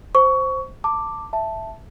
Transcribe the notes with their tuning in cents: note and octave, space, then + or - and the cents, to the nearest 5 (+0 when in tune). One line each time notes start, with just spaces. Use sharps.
C5 +0 C#6 +20
A5 +25 D6 +0
E5 +0 A5 +0